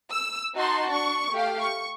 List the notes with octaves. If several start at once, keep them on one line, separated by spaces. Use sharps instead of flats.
E6
D#4 F#4 A5 C6
D4 C#6
A3 G4 F5
C#6